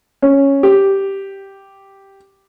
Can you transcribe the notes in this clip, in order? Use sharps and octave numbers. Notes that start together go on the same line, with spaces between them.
C#4
G4